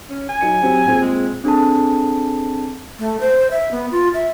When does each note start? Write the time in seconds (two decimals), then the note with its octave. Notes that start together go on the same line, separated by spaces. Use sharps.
0.10 C#4
0.29 G#5
0.41 F#3 D#4 C#7
0.62 F#3 C4 G4
0.86 A#2 C4 G#4
1.02 G#3
1.44 C4 D4 G#4 A4 A5
2.99 A3
3.20 C5
3.51 E5
3.71 B3
3.91 F4
4.14 E5